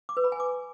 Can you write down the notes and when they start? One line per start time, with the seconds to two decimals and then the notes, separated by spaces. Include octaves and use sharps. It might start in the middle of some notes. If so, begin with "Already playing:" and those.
0.09 D6
0.17 B4
0.24 B5
0.32 G#5
0.40 D6